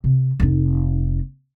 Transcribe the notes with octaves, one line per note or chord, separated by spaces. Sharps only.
C3
F1 D#4